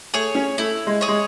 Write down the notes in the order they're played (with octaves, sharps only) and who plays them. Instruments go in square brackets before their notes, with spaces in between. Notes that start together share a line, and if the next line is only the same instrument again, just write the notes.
[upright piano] A3 [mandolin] G#4 C#5
[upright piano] C#4
[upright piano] A3 [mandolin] E4
[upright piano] G#3
[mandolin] G#4 C#5
[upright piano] G#3